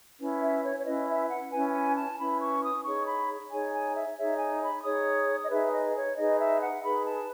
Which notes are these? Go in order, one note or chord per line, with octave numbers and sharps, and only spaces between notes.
C#4 E4 B4
E5
C#5
C#5
C#4 E4 B4 D#5
E5
F#5
C#4 E4 B4 G#5
G#5
A5
C#4 E4 B4 B5
C#6
D#6
D#4 G#4 C#5 C#6
B5
D#4 G#4 C#5 G#5
G#5
E5
D#4 G#4 C#5 E5
G#5
B5
D#4 G#4 C#5 D#6
D#5
D#4 G#4 B4 E5
D#5
C#5
D#4 G#4 B4 D#5
E5
F#5
D#4 G#4 B4 B5
A5